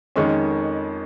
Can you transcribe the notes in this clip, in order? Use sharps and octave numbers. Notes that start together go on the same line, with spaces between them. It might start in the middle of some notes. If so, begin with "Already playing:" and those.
F2 D#3 G#3 C#4 C#6